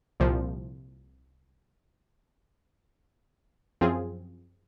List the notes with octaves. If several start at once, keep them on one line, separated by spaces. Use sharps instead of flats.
C2 A#2 F3
F#2 F3 C4 F4 G#4